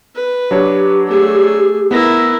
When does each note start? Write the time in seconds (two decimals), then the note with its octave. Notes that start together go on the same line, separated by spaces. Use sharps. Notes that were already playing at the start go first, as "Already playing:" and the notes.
0.15 B4
0.51 F#3 D4 G4 C#5
1.08 A3 G#4
1.91 B3 E4 A#4 B4 A#6